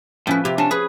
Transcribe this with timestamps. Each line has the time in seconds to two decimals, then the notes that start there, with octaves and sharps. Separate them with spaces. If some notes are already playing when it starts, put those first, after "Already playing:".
0.27 A2 F3 C#4 B4
0.45 C3 G4
0.58 C#4 D4 A5
0.71 G#4 B4